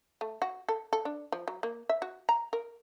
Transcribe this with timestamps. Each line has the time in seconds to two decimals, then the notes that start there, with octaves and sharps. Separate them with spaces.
0.21 A3
0.42 F#4
0.69 A4
0.93 A4
1.05 D4
1.32 F3
1.48 F#3
1.63 A#3
1.89 E5
2.02 F#4
2.29 A#5
2.53 A#4